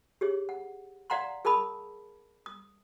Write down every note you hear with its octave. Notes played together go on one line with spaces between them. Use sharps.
G4 G#4 C#5
F#5
D5 F5 F#5 A#5 C6
G#4 A#4 A5 B5 D#6
D#6